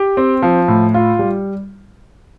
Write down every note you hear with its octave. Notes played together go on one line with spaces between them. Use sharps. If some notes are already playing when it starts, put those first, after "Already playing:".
Already playing: G4
C4
F3
A2
F4
G3